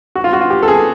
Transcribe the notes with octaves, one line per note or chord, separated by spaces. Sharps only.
F#4
F4
F#4
F4
G4
A4
G#4